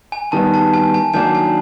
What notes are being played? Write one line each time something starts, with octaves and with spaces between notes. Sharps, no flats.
G#5
D#3 G3 B3 D#4 A5
A5
G#5
G#5
D#3 F#3 A#3 D4 G#5
G#5